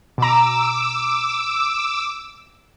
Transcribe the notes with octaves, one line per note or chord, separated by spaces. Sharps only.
B2 A#5 D6 E6